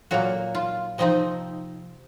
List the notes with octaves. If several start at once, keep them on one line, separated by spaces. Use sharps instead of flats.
A#2 F#3 A#3 F#4
F4
C3 F3 C4 D#4 D#5